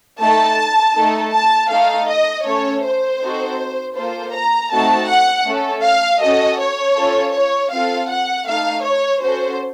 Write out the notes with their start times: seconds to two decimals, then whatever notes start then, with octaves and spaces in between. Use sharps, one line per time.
0.20 A3 D#4 A4 A5
0.96 A3 D#4 A4
1.34 A5
1.70 A3 D#4 A4 F5
2.08 D#5
2.45 A3 C#4 A4 C#5
2.84 C5
3.21 C4 D#4 F#4 A4
3.96 A#3 F4 A4 C5
4.34 A#5
4.72 A3 C4 D#4 F#4 A4 A5
5.09 F#5
5.46 A3 C#4 A4
5.84 F5
6.22 C#4 F#4 A4 D#5
6.60 C#5
6.96 C#4 F4 A4
7.34 C#5
7.72 C4 F4 A4 F5
8.10 F#5
8.47 A3 D#4 A4 F5
8.85 C#5
9.22 C#4 F#4 A4 C5